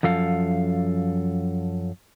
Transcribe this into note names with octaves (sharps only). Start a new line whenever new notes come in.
F#2 F3 A4 F5